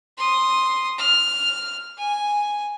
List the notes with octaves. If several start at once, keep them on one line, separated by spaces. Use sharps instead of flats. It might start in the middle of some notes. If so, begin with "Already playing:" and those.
C6 D#6
F6
G#5